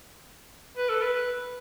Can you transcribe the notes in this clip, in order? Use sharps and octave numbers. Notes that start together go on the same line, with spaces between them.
B4
A4
B4